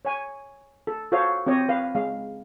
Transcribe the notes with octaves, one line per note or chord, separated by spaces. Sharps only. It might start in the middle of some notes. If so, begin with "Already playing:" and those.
C#5 G#5
A4
F#4 A4 C5 C#5 F5
C4 G4 C#5 D#5
B4 F5
G#3 F5